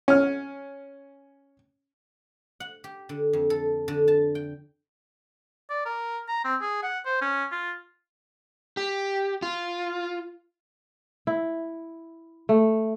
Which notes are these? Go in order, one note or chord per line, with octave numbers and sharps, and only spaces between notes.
C#4 F6
F#5
G4
D3
F2
A4
D3
A5
G5
D5
A#4
A#5
C4
G#4
F#5
C5
C#4
F4
G4
F4
E4
A3